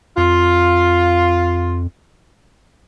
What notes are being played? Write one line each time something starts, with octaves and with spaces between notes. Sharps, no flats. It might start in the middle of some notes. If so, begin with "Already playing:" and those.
F2 F4